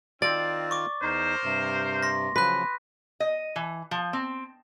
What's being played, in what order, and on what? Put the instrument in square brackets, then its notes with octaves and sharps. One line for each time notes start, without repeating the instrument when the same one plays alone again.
[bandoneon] D#3 F4 [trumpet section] C4 [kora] D5 [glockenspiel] A6
[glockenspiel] C#6 D6
[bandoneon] E2 D#4 [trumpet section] A#4 C5
[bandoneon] G2 C3
[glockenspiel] C6 A#6
[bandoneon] C#3 F3 F#3 [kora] B4 [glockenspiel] F#6 B6
[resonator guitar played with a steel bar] D#5
E3
F3
C4